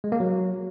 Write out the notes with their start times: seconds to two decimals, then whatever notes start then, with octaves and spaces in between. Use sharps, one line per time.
0.04 G#3
0.12 A#3
0.20 F#3